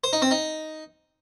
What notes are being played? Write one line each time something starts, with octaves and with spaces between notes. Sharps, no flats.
C5
D#4
C4
D#4